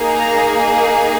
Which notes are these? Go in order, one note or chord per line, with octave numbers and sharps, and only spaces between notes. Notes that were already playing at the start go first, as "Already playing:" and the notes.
Already playing: A#3 D#4 G#4
A#5